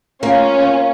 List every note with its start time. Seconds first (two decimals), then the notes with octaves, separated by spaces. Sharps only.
0.23 A#3 C#4 F4